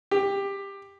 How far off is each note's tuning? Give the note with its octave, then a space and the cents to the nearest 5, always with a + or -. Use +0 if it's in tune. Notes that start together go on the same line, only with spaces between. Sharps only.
G4 +15